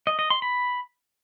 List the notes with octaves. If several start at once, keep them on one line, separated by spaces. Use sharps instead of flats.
D#5
D#5
C6
B5